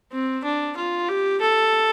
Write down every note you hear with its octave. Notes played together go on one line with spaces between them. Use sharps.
C4
D4
F4
G4
A4